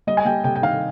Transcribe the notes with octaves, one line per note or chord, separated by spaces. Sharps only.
G3 D#5
G#5
G3 G5
C3 G5
G5
D#3 F5